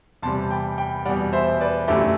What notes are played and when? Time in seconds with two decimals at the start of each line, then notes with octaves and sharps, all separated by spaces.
0.22 E2 C3 G3 A5 C6
0.50 G5 B5
0.78 G5 B5
1.05 E2 B2 G3 D5 F#5
1.33 C5 E5
1.61 B4 D5
1.88 F#2 D3 A3 E4 G4